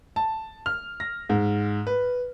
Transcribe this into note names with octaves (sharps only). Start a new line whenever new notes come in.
A5
F6
A#6
G#2
B4